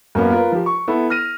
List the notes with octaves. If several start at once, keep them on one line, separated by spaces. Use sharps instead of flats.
F#2 A#3 B3
F4 A#4 B4
F3 G4
C#6
B3 E4 A4
F6 A#6 D#7